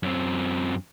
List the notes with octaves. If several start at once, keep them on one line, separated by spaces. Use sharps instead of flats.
F#2 C4